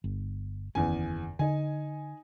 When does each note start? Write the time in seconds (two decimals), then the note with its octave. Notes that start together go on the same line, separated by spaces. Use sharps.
0.04 G1
0.75 F#1 E2 D#3 C#4 G#5
1.39 D3 D#4 G#5